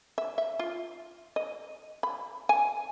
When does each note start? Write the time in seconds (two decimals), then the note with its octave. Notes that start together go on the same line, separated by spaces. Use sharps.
0.18 E5
0.38 E5
0.59 F4
1.36 D#5
2.03 B5
2.49 G#5